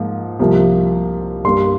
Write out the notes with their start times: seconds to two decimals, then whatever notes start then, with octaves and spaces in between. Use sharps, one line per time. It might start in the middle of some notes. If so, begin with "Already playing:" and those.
Already playing: G#2 F3 A#3
0.39 C2 C3 F3 A#3
1.44 G2 G3 A#3 C6